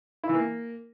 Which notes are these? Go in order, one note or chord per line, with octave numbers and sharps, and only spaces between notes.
E4
E3
A#3